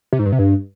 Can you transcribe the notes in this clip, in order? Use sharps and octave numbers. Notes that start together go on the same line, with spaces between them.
C3
G#2
G2
C3
G2